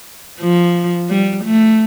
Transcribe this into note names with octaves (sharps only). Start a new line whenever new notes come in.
F3
G3
A3